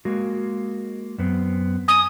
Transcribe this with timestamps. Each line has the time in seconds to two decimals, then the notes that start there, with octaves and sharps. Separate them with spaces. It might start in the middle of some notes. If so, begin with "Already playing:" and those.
0.05 G#3 A#3 F#4
1.18 F#2 B3 C4
1.88 G#5 D#6